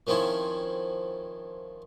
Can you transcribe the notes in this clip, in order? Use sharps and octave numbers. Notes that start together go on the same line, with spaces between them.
D#3 F3 C4 C#4 E4